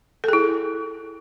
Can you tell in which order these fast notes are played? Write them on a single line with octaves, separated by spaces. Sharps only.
A4 G#4 E4